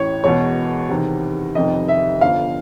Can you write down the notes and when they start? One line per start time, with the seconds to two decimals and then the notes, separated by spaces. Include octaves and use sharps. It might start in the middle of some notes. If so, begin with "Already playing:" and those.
Already playing: A1 A2 E3 C#5
0.24 E1 E2 B2 C#5
0.89 E2 C3 D#3
1.55 F1 F2 C3 D#3 D#5
1.88 E5
2.21 G1 F2 D3 F3 F5